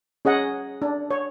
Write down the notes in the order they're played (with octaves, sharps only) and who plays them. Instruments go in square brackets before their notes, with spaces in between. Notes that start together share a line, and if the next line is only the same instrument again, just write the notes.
[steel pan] C#4 G#4 D#5 F#5
D4
C#5